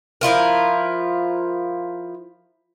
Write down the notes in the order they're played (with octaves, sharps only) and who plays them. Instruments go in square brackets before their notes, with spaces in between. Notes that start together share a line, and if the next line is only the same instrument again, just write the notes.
[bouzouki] F3 E4 F4 A#4